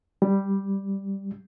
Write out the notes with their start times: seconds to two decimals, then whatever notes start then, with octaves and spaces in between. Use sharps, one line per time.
0.22 G3